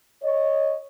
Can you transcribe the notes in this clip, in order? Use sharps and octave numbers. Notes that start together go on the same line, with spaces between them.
C#5 D#5